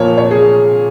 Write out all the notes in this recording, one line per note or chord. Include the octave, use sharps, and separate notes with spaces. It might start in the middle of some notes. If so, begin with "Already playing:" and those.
Already playing: A#2 F3 A#3 C#5
C#5
G#4